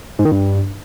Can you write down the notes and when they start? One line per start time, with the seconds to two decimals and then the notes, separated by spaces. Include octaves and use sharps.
0.19 G#2
0.25 D#3
0.32 G2